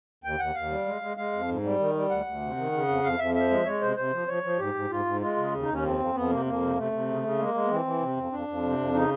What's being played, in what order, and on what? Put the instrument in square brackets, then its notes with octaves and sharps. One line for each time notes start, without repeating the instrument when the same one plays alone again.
[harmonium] D#2 G5
D#2 F#5
D#2 F5
G3
G#3
G#3
G#3 F5
F2
G#2
G3
D#3
G3
D2 F#5
D2
C3
D#3
C#3
F2
F2 F5
F2 E5
F3 E5
G#3
G#3 C#5
C3 C5
C3 C5
F3
F3 C#5
F3
G#2 G4
G#2
G#2 F4
G#2
G#3 F4
C#3
D#2
D#4
D#2
C#4
F2 C4
F2
F2 B3
C3 A#3
F2 A#3
C3
C3 A3
C3
C#3
C#3
G#3 A#3
G#3
B3
E3 C4
E3
C3
F2
F2 D4
F2
C3
F2
C#3 D#4